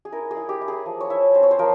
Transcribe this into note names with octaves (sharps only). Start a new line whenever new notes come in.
G#4
E4 A#4
G#4
E4
G4
E4
G#4
F3
C#5
E4 E5
C4 C5
C#5
C5
F3 A#4